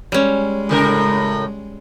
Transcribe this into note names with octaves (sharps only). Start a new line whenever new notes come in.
G3 G#3 C#4
A2 C#3 A#4